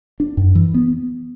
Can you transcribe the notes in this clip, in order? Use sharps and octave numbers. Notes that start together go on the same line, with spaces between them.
D4
F#2
E3
B3